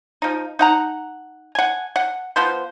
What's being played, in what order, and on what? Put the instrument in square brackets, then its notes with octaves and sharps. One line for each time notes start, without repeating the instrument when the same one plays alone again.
[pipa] F3 D#4
D#4 F#5 A#5
F#5 G#5
F#5
F3 B3 C5